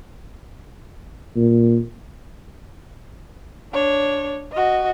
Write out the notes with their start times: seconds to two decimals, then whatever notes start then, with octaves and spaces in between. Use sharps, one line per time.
1.36 A#2
3.73 D4 C#5
4.52 F#4 D#5